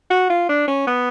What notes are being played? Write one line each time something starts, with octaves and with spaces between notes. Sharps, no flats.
F#4
F4
D4
C#4
B3